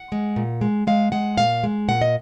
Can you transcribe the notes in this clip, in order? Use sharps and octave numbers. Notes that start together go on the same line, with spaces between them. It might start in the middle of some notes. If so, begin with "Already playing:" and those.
Already playing: F#5
G#3
A#2
G#3
G#3 F5
G#3 F#5
A#2 F5
G#3
A#2 F#5
D#5